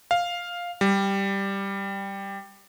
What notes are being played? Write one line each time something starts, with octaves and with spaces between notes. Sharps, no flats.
F5
G3